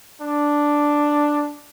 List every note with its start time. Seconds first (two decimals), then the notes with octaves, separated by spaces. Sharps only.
0.21 D4